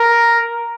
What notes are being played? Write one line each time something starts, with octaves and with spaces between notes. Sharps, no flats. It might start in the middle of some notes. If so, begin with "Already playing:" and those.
Already playing: A#4